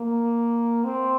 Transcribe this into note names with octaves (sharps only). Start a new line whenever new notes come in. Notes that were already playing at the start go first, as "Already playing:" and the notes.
Already playing: A#3
C4